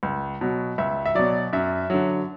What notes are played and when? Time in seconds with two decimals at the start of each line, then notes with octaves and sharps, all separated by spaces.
0.03 C#2
0.41 B2 F#3
0.78 C#2 E5
1.06 E5
1.15 B2 F#3 D5
1.53 F#2 E5
1.90 D3 F#3